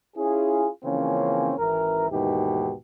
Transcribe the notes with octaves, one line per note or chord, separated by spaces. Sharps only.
C#4 E4 F4 G#4
C#3 E3 F3 A#3 C4 C#4
G#1 E3 A#4
D#2 G#2 B2 D#3 E3 G4